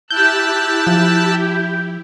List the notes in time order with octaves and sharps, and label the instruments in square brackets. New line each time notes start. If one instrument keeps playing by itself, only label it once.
[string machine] E4 G4 [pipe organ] A5 E6 F#6 [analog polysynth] G6
[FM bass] F3